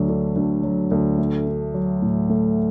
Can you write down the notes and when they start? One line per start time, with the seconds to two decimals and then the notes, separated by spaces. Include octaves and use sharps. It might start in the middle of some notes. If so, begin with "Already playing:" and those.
Already playing: D2 F#3
0.09 D3
0.36 D2
0.64 F#3
0.91 D2
1.18 A3
1.47 D4
1.74 F#3
2.02 A2
2.29 A3